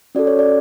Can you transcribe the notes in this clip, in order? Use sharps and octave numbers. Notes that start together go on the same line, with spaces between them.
C#4 F#4 A4 D5
C#5
D5